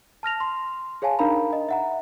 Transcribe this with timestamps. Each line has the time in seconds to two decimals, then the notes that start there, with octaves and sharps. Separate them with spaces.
0.23 A5 F6 A#6 F7
0.40 C6
1.02 G#4 C#5 F5 G#5 A5
1.19 D4 D#4 A#4 F5 A#5 B5
1.53 D#5
1.69 E5 F#5 A#5